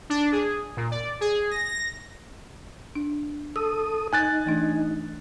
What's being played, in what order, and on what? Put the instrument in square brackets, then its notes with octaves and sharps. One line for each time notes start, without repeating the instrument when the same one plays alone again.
[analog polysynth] D4
G#4
A#2
D5
G#4
A#6
[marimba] D4
[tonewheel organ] A4 D#6 [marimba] E6
[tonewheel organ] D#4 [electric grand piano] G#5 F#6 A6
[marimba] E3 A3 D4